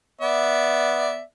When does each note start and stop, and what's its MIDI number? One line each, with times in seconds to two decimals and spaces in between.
0.21 1.21 59
0.21 1.21 74
0.21 1.21 76